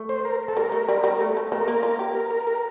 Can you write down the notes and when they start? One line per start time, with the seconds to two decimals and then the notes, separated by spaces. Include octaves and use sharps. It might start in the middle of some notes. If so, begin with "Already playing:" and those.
Already playing: A3
0.09 C5
0.25 A#4
0.48 A4
0.57 G3 A#4
0.72 A3
0.89 G3
1.04 G3
1.20 A3
1.37 A3
1.52 A3 A#4
1.68 A#3
1.83 F4
1.99 G4
2.15 A#4
2.31 A#4
2.47 A#4